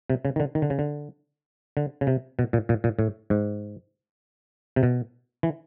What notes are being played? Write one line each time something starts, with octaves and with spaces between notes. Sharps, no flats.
C3
C#3
D#3
D3
D#3
D3
C#3
D3
D3
C#3
C3
B2
A#2
A#2
A#2
A2
G#2
C3
B2
E3